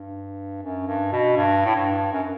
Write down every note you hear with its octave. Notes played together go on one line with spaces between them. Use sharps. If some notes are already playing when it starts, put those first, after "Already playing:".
Already playing: G2
F#2
G2
B2
G2
A2
G2
F#2